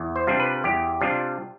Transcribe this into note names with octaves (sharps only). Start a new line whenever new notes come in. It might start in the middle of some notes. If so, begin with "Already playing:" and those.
Already playing: E2
C5
C3 G3 D4 F4
B4
E2 G4
C3 G3 D4 F4